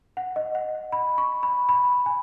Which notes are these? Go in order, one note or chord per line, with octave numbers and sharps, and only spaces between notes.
F#5
D#5
F#5
B5
C#6
B5
B5
G#5